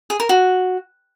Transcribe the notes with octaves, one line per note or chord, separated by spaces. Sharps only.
G#4
A#4
F#4